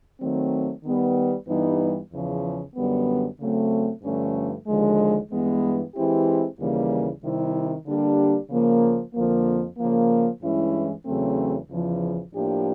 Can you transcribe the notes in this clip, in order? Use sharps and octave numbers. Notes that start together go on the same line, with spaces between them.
D#3 F#3 A3 C4
D#3 G3 B3
G2 E3 G3 B3 D#4
E2 C#3 F3
F#2 D3 G3 B3
C#3 F#3 A3 C4
G2 D3 F3 A3 C#4
D#2 D3 F3 G#3
G2 E3 G#3 B3
E3 G#3 C4 E4 G4
D#2 C#3 E3 G3 A#3
C3 D#3 G3 C4 E4
D3 G3 A#3 D4 G4
C#3 F3 A#3
F2 D3 F3 A#3
C#3 F3 A#3
G2 E3 G#3 C#4 E4
E2 C#3 F#3 A3 C4
E2 C#3 F3
A2 F3 A#3 D4 G4